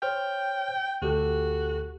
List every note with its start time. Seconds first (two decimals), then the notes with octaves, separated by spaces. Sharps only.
0.02 C5 C#5 G5 F6
1.02 D2 F#4 G4 A4